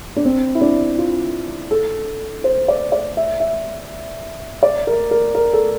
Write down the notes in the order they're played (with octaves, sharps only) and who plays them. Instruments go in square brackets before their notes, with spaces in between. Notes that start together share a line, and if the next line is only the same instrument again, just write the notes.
[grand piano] D4
C4
E4
D4
F4
A4
C5
D5
D5
E5
E5
D5
A#4
A#4
A#4
A4